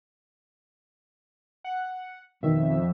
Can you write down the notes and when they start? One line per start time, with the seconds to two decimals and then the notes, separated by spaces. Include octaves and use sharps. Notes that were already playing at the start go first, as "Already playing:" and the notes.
1.64 F#5
2.43 F2 B2 D#3 E5